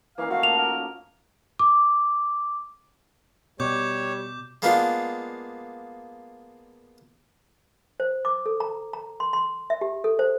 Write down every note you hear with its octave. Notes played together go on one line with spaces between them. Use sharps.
E3 A#3 C#4 D#4 F5
F3 A3 F#4 F5
A#3 F7
A#4
D6
B2 G3 C#5 D6 G6
G#3 A#3 B3 D4 F4
C5
D6
A4
A#5
A#5
C6
C6
E5
G4
A4
C5